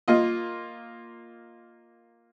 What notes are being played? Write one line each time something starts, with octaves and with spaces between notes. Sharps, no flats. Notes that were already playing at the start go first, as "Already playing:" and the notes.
A#3 F4 D#5